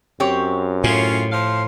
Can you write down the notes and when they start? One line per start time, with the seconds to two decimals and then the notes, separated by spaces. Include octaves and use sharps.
0.20 F#2 C4 G4 C#5
0.84 A2 C#4 F4
1.32 F3 C5 F5